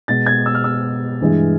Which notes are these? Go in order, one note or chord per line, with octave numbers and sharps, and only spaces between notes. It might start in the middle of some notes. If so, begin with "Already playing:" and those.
B2 G#3 A6
G#6
E6
F6
E6
G2 E3 G#3